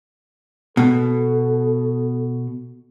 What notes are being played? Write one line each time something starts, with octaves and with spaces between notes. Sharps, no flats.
B2 A4